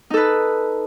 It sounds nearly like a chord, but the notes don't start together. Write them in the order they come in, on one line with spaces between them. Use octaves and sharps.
D#4 A4 B4